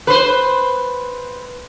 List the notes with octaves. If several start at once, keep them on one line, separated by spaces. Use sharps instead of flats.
B4 C5